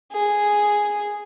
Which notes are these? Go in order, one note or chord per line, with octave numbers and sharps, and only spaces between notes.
G#4